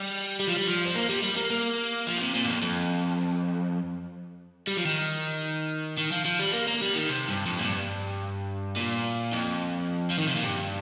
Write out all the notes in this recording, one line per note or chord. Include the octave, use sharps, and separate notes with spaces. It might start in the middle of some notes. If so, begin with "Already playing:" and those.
Already playing: G3
G3
F3
G3
F3
C4
A#3
G3
G3
A#3
A#3
F3
A#2
C3
A#2
G2
F2
F2
G3
F3
D#3
D#3
F3
F3
G3
A#3
A#3
G3
D#3
C3
G2
F2
A#2
G2
A#2
F2
F3
D#3
C3
A#2
G2